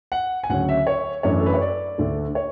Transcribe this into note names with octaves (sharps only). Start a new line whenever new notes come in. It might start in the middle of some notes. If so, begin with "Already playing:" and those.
F#5
G#5
D2 C#3 F#3 C#4 F#5
E5
C#5
F#2 E3 A3 D4 C#5
A4
B4
C#5
D5
D2 D3 A3
C#5